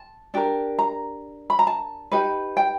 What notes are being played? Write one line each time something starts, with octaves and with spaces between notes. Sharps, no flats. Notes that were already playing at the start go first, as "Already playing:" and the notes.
Already playing: A5
D4 G4 A#4
A#5
B5
A#5
A5
D#4 G4 B4
G5